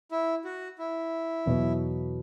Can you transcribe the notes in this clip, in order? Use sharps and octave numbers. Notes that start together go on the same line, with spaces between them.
E4
F#4
E4
E2 B2 F#3 B3